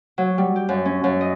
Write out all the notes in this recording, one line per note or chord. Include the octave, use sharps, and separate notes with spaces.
F#3
G3
G4
F#2
C#4
F#2
D#5